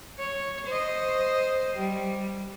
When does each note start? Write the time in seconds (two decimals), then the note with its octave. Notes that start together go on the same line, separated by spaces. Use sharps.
0.19 C#5
0.67 C5 D#5
1.76 G3